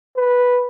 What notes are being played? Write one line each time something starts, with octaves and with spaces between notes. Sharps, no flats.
B4